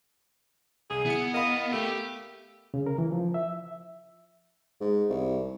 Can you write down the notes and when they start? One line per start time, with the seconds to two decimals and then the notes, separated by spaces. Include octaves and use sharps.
0.90 C2 G#4
1.06 B3 E4 C#7
1.34 A#4 D#5 F5 B5
1.72 A3 G4 G5
2.74 C#3
2.87 A#4
2.98 E3
3.12 F3
3.34 E5
4.81 G#2
5.09 C2